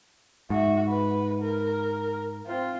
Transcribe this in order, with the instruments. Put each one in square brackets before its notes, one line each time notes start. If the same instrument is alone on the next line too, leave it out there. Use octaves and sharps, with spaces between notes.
[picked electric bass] G#2 [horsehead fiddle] F#4 E5
[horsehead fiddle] B4
A#4
C4 F4